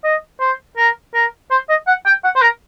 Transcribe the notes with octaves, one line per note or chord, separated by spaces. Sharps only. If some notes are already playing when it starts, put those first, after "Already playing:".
D#5
C5
A#4
A#4
C5
D#5
F#5
G5
F#5
C5
A#4